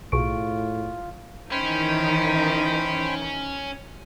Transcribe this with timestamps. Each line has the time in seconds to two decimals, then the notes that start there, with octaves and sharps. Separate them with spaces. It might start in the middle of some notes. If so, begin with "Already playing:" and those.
0.12 B1 A2 F4 G#4 C#6 D7
1.51 D#3 E3 C#4 D#4 C5 G5 B5